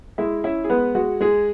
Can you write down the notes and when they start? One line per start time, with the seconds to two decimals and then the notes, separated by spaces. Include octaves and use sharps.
0.18 G#3 E4 E5
0.44 C#4 E4 E5
0.64 G#4
0.70 G#3 B3 B4
0.95 G#3 F#4
1.21 G#3 G#4